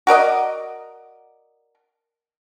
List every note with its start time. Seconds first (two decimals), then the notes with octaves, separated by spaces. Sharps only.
0.07 F#4 A#4 D5 D#5